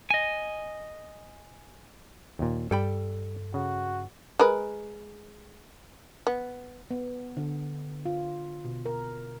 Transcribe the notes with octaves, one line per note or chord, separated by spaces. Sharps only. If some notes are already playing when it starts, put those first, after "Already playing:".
D#5 G#5
D#2 A#2
G2 G3 A4 G5 B5
C#3 F#4
G#3 A#4 B4
B3
B3
D3
F4
B2
A#4